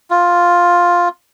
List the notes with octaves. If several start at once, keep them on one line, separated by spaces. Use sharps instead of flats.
F4